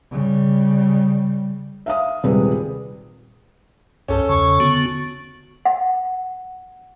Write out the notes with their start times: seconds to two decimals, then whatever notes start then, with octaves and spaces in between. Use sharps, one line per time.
0.12 C#3 G3
1.86 E5 F5 D#6
2.23 D#1 C3 G3 G#3 B4
4.08 C2 G2 C#4 A4
4.29 E2 C#3 A5 C#6
4.60 D3 B3 F#4
5.65 F#5